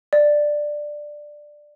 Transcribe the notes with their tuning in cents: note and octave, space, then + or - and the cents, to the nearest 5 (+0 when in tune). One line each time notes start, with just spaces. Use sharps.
D5 +10